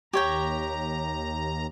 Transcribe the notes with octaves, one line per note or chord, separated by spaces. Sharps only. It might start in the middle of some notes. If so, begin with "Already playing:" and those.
D#2 G4 C#5 G5 A#5